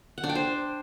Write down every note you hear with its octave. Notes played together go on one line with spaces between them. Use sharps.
F#5
D4
G5
C5